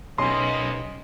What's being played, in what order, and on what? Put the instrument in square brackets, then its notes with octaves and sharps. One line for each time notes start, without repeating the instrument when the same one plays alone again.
[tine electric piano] B1 C#4 [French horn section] C3 A#3 B3 [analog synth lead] D#5 [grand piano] C6